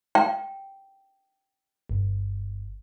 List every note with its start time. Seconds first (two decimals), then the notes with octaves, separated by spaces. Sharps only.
0.15 G5
1.89 G1